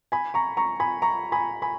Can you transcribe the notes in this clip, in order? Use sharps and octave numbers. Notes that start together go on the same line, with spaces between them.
G#5 B5
A#5 C#6
A#5 C#6
G#5 B5
A#5 C#6
G#5 B5
G#5 B5